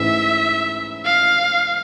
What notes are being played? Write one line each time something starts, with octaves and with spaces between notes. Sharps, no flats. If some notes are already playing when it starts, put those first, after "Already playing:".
Already playing: G#2 E3 A3 C#4 E4 E5
F5